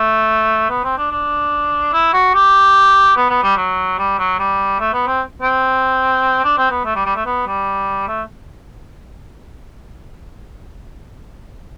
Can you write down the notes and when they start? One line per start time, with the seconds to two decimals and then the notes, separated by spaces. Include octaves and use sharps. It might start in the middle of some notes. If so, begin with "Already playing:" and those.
Already playing: A3
0.70 B3
0.84 C4
0.98 D4
1.11 D4
1.93 E4
2.14 F#4
2.35 G4
3.17 B3
3.29 B3
3.43 G3
3.57 F#3
3.98 G3
4.19 F#3
4.39 G3
4.80 A3
4.93 B3
5.07 C4
5.42 C4
6.44 D4
6.58 C4
6.71 B3
6.85 A3
6.95 G3
7.05 G3
7.16 A3
7.26 B3
7.47 G3
8.08 A3